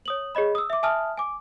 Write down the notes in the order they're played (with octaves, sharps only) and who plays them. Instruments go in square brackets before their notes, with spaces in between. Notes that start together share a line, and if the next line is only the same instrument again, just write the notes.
[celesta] C#5 D#6 F#7
G#4 C#5 D#5 B5
D#6 E6
E5 D6
E5 G#5 A5 D#6 F6
G#5 D6